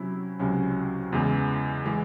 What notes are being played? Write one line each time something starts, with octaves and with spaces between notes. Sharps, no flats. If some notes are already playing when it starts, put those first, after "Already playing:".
Already playing: C3 F#3 C#4 E4
C#2 C3 F#3 C#4 F#4
E2 C#3 E3 G#3
E3 G#3